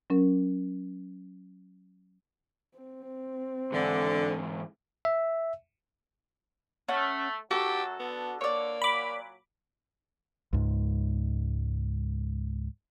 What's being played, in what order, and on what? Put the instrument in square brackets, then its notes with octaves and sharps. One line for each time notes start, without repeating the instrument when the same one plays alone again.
[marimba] F#3 C#4 A#4
[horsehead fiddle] C4
[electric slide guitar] G#2 E3 [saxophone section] D3
[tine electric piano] E5
[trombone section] A3 [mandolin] C#4 F#5
[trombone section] F#2 F#3 [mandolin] F#4 A4 [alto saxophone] G4
[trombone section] D3 [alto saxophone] B3
[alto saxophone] A#3 [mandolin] C#5 D5
[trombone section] A#2 F#3 [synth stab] B5 D6
[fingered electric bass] C#2 G#2